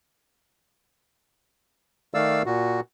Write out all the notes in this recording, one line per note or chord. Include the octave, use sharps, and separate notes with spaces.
D#3 A3 D5 F5 E6
A#2 F#4